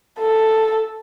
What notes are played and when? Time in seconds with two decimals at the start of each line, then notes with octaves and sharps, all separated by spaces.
0.19 A4